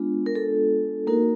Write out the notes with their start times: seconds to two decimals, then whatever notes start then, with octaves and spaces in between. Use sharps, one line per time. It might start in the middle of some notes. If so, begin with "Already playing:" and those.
Already playing: G#3 B3 D4 F4
0.26 A#4
0.35 A4
1.07 A#3 D#4 F#4 A#4